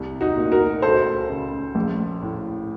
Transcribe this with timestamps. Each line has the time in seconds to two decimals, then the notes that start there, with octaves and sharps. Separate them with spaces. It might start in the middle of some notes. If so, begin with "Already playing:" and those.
Already playing: C2
0.21 D#4 F#4
0.37 A#2
0.52 F#4 A#4
0.82 C#2 A4 C5
1.30 C#3
1.75 A#1
2.23 A2